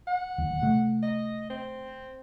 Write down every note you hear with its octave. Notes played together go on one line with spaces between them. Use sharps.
F#5
D1 D#2
C3 A3
D#5
C4